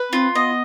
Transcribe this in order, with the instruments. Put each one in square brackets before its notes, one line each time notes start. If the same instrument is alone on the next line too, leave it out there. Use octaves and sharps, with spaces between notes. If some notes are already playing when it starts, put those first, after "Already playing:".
Already playing: [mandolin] B4
[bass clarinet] C4 [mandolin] F4
[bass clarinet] B3 [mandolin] D#5